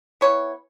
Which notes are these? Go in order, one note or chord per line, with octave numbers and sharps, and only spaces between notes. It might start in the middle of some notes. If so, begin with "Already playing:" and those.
E3 B3 C#5